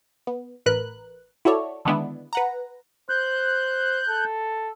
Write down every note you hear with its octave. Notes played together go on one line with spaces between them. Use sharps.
B3
A1 A#4 B4 F#6
E4 F#4 A4 C#5 D5
D3 D#3 G#3 B3 D4 E4
B4 F#5 A#5
C5 F#6 G6
A4